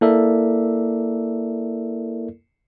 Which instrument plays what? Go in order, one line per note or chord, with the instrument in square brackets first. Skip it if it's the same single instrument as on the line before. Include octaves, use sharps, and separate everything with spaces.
[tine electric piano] A#3 E4 A4 A#4 D5 E5